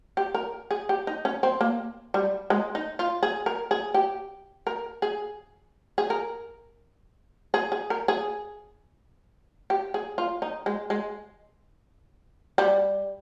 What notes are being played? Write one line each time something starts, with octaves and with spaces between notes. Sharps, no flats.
G4
A#4
G#4
G4
D#4
C#4
C4
A#3
G3
G#3
D#4
F4
G#4
A#4
G#4
G4
A#4
G#4
G#4
A#4
G#4
G#4
A#4
G#4
G4
G#4
F4
D#4
G#3
G#3
G3